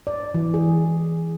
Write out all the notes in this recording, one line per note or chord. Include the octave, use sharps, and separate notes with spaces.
D5
E3
G#4